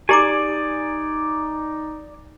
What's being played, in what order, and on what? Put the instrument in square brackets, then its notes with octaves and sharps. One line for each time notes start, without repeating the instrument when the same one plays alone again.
[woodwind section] D#4 [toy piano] G4 A#5 D6 [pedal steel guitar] D5 G#5